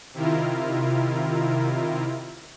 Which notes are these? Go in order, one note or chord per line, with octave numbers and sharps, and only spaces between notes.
C3 D#3 E4 F4 A#4